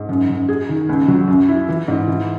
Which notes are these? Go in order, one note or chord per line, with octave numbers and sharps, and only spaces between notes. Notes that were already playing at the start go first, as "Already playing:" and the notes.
Already playing: G#2
F#2
F#2
G#4
D#3
C#2
F#3
F#2
E4
E3
G#2
E3